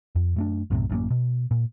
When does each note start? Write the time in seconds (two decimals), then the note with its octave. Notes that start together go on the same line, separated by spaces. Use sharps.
0.15 F2
0.36 F#2 A3 D4
0.70 B1 F#2 A2 C3
0.89 A1 F#2 A#3
1.10 B2
1.51 A#2